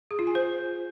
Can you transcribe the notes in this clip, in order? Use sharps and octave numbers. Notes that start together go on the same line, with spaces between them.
G#4
F4
G#5
C5